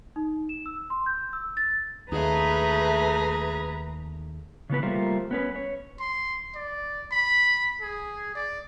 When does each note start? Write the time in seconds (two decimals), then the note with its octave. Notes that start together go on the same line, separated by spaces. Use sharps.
0.16 D#4
0.49 E7
0.66 E6
0.90 C6
1.06 G6
1.33 E6
1.57 A6
2.12 D#2 A3 G#4 B4 A#5
4.70 C#3 E3 B3 B4
4.83 G3 A3 A#3 F4 A#4 C5
5.31 B3 C#4 B4
5.56 C#5
6.00 C6
6.55 D5
7.12 B5
7.81 G#4
8.35 D5